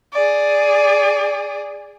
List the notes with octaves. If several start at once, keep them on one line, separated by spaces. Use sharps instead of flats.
G#4 D5